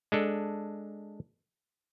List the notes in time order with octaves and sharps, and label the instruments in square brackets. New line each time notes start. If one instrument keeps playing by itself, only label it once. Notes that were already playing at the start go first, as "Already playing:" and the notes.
[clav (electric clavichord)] G#3 D4 A4